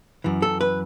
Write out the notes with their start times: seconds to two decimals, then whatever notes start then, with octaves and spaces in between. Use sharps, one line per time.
0.24 F#2 E3
0.42 A4
0.61 B4